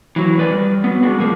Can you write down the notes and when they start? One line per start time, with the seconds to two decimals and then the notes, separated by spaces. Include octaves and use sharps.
0.16 E3 F#3
0.37 E2 E3 B4 D5 G#5
0.51 G3
0.84 F#3 B3
1.03 G3 G#3 D4 F#4
1.18 F#2 C#3 F3 G#3 A#3